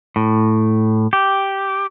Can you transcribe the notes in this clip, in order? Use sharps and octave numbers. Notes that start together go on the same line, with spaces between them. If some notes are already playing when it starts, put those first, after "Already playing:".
A2
G4